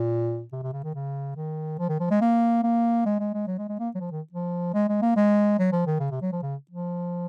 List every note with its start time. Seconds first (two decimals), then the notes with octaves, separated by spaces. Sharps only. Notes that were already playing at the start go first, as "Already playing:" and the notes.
Already playing: A#2
0.53 C3
0.63 C3
0.73 C#3
0.84 D#3
0.95 C#3
1.36 D#3
1.79 F3
1.89 D#3
2.00 F3
2.11 G#3
2.21 A#3
2.64 A#3
3.06 G#3
3.20 G#3
3.34 G#3
3.47 F#3
3.58 G#3
3.69 G#3
3.80 A#3
3.95 F#3
4.00 F3
4.11 D#3
4.32 F3
4.74 G#3
4.89 G#3
5.02 A#3
5.16 G#3
5.59 F#3
5.72 F3
5.87 D#3
6.00 C#3
6.11 C3
6.22 F#3
6.32 F3
6.43 C#3
6.71 F3